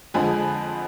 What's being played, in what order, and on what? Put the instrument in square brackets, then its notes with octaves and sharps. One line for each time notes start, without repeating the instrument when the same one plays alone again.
[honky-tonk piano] F2 D3 F3 G#3 G#5 B5